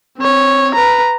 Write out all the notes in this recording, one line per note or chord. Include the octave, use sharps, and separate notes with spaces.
C4 C#5
B4 A#5